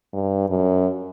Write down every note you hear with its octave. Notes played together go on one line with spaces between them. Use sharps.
G2
F#2